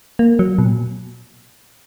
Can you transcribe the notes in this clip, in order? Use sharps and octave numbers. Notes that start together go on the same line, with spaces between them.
A#3
F#3
B2
A#2